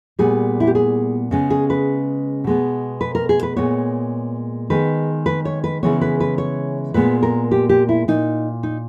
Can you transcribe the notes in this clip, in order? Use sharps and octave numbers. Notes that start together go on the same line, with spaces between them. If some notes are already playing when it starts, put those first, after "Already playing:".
A#2 G3 B3 G#4
E4
G4
G#4
C#3 G#3 B3 C#4
G#4
B4
B2 G#3 B3
B4
A#4
G#4
B4
A#2 G#3 B3 C#5
D#3 G#3 B3 B4
B4
C#5
B4
C#3 E3 G#3 B3 C#5
B4
B4
C#5
A#2 G#3 B3 B4
A#4
G4
G4
E4
A#2 A#3 D#4
D#4